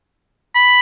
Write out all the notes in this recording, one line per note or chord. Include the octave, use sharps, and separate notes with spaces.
B5